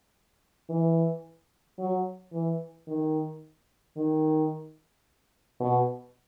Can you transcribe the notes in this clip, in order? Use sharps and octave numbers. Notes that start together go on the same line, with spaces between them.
E3
F#3
E3
D#3
D#3
B2